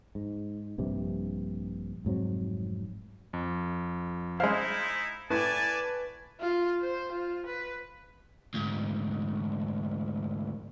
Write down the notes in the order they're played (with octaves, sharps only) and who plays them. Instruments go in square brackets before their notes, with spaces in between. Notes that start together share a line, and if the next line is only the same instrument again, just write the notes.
[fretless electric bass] G#2
A#1 G2 C3
F1 G#2 F#3 C4
[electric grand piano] F2
[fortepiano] G#3 F5 [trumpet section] D#4 E4 [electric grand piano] C5
[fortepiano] A2 [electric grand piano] B4 A6 [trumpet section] D5 G#5 A5
[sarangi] F4
C5
F4
B4
[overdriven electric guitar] D2 G#2